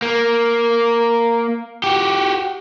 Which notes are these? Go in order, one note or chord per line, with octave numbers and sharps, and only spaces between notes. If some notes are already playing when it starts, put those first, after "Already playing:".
A#3
F#4 G4